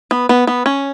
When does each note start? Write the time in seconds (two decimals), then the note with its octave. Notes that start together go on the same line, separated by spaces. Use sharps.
0.11 B3
0.29 B3
0.47 B3
0.66 C#4